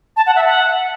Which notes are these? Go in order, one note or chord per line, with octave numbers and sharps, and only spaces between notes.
A5
F#5
E5
F#5